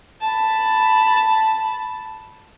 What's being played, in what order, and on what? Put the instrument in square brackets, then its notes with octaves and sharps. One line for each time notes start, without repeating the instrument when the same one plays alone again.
[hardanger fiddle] A5 B5